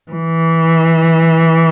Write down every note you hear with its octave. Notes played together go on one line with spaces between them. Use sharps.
E3